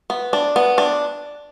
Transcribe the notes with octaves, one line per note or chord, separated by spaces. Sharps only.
B3
D4
B3
D4